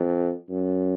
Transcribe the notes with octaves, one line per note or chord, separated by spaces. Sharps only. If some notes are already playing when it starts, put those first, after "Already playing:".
Already playing: F2
F#2